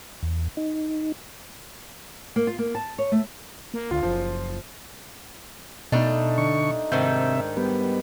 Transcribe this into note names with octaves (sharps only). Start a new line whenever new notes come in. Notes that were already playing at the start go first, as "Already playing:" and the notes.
E2
D#4
A#3
F4
A#3
A5
C#5
A3
A#3
D2 F4
F#1 F3
B2 G3 A3 D4 D#4
D3 C#6
G#2 C3 D#3 D4 E5 G6
G3 B3